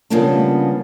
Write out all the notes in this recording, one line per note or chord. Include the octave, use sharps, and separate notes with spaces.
C#3 F3 G3 A#3 B3 D4